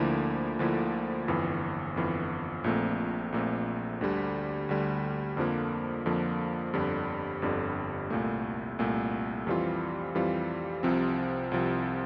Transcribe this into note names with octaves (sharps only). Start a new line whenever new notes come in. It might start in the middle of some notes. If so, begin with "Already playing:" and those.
Already playing: D2 D3 F3 A#3 E4
D2 D3 F3 A#3 E4
G1 F2 E3
G1 F2 E3
A#1 A#2 A3 C4
A#1 A#2 A3 C4
D2 D3 G3
D2 D3 G3
F2 D3 F3 A#3
F2 D3 F3 A#3
G1 F2 D3 G3
G1 F2 D3 G3
C2 A#2 A3
C2 A#2 A3
F2 E3 G3 C4 F4
F2 E3 G3 C4 F4
C2 C3 F3 C4
C2 C3 F3 C4